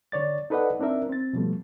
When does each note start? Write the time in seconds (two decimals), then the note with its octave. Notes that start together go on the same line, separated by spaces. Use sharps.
0.12 D3 C#5 D5 A6
0.50 D#4 A4 B4 D5 D#5 F#5
0.80 C4 D4 D#4 A#4 E5
1.09 C4 A6
1.33 B2 F3 G3 A3